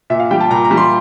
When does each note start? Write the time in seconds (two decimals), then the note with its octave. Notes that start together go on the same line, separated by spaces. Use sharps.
0.10 A#2 E5
0.20 F5
0.31 G3 G5
0.40 A5
0.50 A#2 A#5
0.64 A#5
0.71 G3
0.77 C6